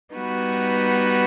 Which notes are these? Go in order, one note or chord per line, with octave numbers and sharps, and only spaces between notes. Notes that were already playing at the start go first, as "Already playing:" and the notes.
G3 B3 D#4 F#4 B4